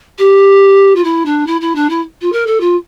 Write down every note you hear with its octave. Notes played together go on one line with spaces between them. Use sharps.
G4
F4
E4
D4
E4
E4
D4
E4
F4
A#4
A4
F4